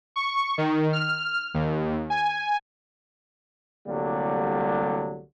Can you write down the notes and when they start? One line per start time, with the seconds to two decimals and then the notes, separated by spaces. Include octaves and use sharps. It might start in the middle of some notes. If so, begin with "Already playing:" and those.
0.16 C#6
0.58 D#3
0.93 F6
1.54 D#2
2.10 G#5
3.87 C2 A2 D3 F#3 G3 A#3